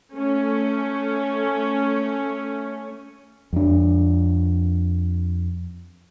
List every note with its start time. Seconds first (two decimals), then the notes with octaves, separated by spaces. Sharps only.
0.14 A3 C#4
3.53 F2 D4